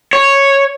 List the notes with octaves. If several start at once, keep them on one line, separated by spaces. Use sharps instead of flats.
C#5